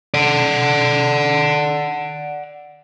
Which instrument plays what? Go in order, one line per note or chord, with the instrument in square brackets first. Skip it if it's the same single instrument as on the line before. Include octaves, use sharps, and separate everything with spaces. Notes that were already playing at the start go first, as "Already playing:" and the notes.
[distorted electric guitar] D5 F#5